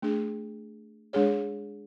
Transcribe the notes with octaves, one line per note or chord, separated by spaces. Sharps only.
A3 D4 G#4
G#3 D4 G#4 C#5